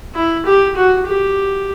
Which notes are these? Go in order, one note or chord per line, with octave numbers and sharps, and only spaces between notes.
E4
G4
F#4
G4